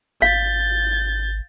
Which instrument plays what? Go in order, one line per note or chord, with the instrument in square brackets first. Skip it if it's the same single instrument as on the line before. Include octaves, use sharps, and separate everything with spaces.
[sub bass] G#1 [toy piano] F5 [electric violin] G6 A6